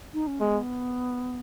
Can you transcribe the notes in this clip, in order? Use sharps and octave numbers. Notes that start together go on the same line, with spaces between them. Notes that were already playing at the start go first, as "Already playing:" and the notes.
D#4
C#4
G#3 B3